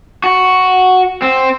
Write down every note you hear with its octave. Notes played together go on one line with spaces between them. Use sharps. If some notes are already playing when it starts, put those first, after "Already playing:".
F#4
C4